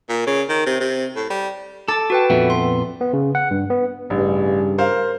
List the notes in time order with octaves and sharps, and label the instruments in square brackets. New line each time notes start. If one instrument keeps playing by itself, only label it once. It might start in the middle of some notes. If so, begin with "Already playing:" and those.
[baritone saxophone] A#2
C#3
D#3
C3
C3
A2
G3
[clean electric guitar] A4 [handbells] D6 A6
[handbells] F#4 B4 G5
[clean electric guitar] F2 A#2 B3 [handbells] A4 E5 F#5
[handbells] C6
[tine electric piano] B3
C#3
F#5
G2
B3
[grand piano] A1 [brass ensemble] G2 C#3
[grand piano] A#4 C5 F5